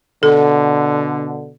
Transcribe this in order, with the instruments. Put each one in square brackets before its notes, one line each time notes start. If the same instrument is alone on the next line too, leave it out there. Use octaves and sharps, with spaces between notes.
[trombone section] B2 D3 [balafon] A4